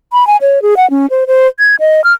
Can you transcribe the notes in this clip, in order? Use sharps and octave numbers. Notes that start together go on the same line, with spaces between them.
B5
G#5
C#5
G#4
F#5
C#4
C5
C5
G#6
D#5
F6